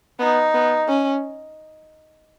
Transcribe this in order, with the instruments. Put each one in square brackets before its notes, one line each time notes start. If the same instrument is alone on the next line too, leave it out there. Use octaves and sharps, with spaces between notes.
[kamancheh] B3 [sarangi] D#4
[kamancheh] B3
C#4